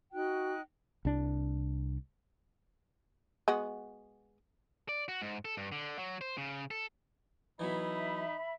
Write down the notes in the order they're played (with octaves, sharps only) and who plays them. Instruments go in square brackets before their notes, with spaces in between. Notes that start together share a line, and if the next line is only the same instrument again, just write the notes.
[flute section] D#4 G5 F#6 [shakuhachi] F#4
[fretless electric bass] C2 D4
[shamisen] G#3 B3 F#4
[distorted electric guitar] D5
F#4
G#2
A4
G2
D3
F#3
C5
C#3
A4
[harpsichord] E3 F#3 B3 [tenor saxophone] D#4 [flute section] E5 B5